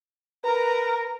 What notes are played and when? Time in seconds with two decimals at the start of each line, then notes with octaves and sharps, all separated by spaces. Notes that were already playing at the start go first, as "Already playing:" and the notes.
0.44 A#4 B4 A#5